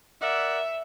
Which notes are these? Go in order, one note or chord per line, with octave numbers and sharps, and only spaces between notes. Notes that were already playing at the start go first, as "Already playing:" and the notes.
A#4 D5 E5 F#5